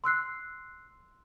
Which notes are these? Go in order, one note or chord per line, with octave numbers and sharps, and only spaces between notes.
C6 E6 F#6 C7